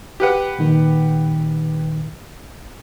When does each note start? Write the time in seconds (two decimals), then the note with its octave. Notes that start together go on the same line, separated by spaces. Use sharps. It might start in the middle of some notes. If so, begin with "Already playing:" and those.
0.20 G4 B4 F#5
0.59 A#2 D#3